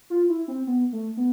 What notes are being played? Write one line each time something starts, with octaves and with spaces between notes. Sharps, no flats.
F4
E4
C4
B3
A3
B3